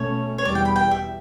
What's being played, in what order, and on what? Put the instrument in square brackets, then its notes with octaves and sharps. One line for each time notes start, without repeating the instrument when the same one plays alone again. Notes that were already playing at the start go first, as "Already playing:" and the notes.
Already playing: [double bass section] B2 A3 C#4 [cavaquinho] C#5
[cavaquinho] C#5
[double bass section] E2 B2 G3 [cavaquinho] D5
[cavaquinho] G5
B5
G5
E5